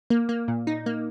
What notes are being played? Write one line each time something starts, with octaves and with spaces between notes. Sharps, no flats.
A#3
A#3
A#2
D#4
A#3